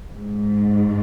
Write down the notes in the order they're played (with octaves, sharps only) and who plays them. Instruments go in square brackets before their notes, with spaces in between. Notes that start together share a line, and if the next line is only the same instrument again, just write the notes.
[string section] G#2